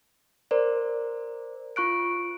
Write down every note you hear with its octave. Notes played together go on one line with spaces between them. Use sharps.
A#4 C5 D5
F4 C#6 F#6 D7